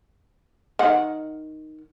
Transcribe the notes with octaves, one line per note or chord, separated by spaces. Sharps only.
D#3 F#5